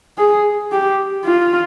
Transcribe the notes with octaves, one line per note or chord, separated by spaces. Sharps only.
G#4
G4
F4